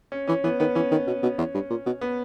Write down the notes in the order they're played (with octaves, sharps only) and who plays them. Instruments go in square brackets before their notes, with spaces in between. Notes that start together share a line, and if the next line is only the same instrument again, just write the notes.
[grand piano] C#4
[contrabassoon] E3 [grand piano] C#4
[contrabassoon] E3 [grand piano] B3
[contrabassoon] D#3 [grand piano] B3
[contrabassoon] E3 [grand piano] C#4
[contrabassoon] D#3
B2
B2
E2
G2
A#2
B2
[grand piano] B3